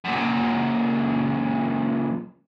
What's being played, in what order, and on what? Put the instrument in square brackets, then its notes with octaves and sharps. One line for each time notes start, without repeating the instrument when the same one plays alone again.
[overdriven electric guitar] F#2 A#2